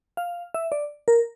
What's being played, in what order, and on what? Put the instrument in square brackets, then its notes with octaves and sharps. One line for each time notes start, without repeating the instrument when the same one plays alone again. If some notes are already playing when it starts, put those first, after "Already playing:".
[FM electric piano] F5
E5
D5
A#4